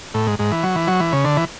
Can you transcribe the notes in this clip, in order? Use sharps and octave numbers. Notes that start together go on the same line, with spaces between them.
A2
G#2
G#2
E3
F#3
E3
F#3
E3
C#3
D3
E3